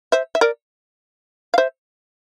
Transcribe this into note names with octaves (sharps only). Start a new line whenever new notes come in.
C5 E5
E5
A#4 D5
F5
C5 E5